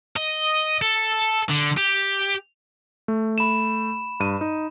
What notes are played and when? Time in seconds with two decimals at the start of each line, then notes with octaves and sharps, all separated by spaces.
0.16 D#5
0.81 A4
1.50 D3
1.77 G4
3.08 A3
3.38 B5 E7
4.20 G2 D#7
4.41 D#4